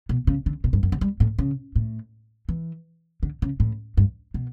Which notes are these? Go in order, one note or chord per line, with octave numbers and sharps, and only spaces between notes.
B2
C#3
D3
B2
G2
F#2
D3
G3
A2
C#3
A2
E3
D3
C#3
A2
G2
B2